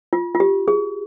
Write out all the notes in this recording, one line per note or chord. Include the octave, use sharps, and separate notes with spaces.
F4
F4
G4
G#4